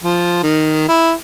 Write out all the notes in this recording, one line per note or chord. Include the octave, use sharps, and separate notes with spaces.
F3
D#3
E4